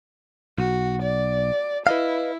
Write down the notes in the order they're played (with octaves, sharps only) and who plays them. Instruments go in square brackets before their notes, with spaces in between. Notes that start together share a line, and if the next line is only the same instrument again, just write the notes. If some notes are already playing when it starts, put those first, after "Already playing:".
[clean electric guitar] B1 [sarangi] F#4
[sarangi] D5
[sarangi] E4 [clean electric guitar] B4 D#5 F5